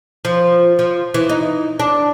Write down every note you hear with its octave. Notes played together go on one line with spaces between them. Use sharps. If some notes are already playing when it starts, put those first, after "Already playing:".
F3
F3
E3
D#4
D4